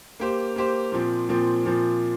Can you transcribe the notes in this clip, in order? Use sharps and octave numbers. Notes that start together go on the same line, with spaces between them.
A#3 G4 C5
A#3 G4 C5
A#2 F3 C4
A#2 F3 C4
A#2 F3 C4